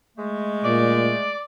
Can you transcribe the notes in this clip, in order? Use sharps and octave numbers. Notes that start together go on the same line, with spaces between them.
G#3 A3
A#2 D5